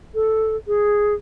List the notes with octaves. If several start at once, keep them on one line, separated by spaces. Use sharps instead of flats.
A4
G#4